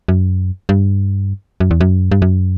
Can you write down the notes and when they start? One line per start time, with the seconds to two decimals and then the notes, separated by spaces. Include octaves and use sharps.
0.08 F#2
0.69 G2
1.60 F#2
1.71 E2
1.81 F#2
2.12 G2
2.22 F#2